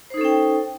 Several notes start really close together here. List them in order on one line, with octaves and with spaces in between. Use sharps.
C5 D#4 A4 C#4 G5